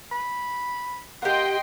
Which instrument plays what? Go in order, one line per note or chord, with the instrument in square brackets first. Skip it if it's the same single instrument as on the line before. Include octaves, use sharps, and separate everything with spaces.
[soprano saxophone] B5
[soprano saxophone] A#3 [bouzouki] G4 F#5 [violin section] D#5 G5 C6